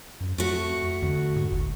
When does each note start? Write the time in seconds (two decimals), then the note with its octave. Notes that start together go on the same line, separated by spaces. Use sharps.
0.21 F#2
0.38 F2 A3 F#4
1.02 F2 D3
1.36 A2
1.52 G1 D2